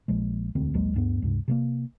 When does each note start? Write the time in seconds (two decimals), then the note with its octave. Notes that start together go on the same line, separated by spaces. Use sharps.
0.08 A#1 F3 G#3
0.55 E1 D2 C4
0.74 A#1 D#2 F#3 G#3
0.94 D2 G2 B3
1.22 C#2 G2 C3
1.48 C3 A3 A#3